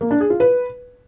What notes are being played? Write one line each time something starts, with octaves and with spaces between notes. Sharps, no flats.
A#3
D4
G#4
F4
B4